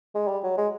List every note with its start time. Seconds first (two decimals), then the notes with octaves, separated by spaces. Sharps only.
0.15 G#3
0.28 G3
0.44 F#3
0.58 G#3